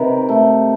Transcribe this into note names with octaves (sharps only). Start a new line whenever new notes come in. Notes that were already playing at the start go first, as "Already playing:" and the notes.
Already playing: C3 D#3 B4
A3